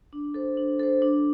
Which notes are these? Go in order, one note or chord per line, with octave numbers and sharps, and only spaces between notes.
D4
A4 C5
D4
A4 C5
D4